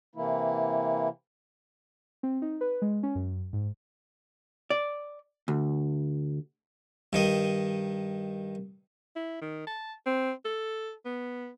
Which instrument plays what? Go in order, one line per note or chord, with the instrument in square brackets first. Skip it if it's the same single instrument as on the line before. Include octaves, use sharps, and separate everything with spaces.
[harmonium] C3 E3 A#3 E4
[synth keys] C4
D#4
B4
G#3
C#4
F#2
G#2
[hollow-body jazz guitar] D5
D2
[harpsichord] G2 D#3 D#5
[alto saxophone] E4
D#3
A5
C4
A4
B3